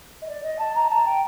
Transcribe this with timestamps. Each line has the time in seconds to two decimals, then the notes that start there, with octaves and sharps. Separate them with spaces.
0.21 D#5
0.28 D5
0.43 D#5
0.58 A5
0.74 A#5
0.89 A5
1.05 G5